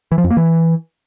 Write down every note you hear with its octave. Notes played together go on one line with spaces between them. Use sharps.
E3
F3
F2
A#3
E3